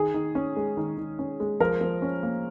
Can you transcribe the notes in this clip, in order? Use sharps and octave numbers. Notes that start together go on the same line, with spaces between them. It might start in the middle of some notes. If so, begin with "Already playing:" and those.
Already playing: D#3 G#4
D#3
C#4
G#3
D#3
D#3
C#4
G#3
F3 A#4
F3
C#4
A#3